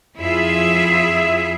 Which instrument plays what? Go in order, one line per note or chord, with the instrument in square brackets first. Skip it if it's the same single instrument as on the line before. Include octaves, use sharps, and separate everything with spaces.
[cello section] F2 E4 F4 G#4 E5